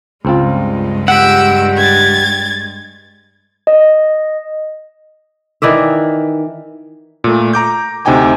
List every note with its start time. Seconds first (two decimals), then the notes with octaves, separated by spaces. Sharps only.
0.25 C#2 G2 G#3 C4 F4
1.08 G4 F#5 E6 D7
1.78 G#6 A6
3.67 D#5
5.62 D#3 E3 D5 E5
7.24 A#2 A3
7.53 A#5 D6 G6
8.05 D2 C3 D#4 G5 G#5 D6